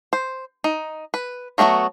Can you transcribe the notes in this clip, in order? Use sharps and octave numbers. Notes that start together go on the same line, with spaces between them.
C5
D#4
B4
F#3 A3 B3 D#4 F#4